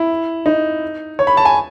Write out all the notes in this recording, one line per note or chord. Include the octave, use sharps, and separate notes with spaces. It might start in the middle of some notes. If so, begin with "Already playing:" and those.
Already playing: E4
D#4
C#5
B5
A5
G#5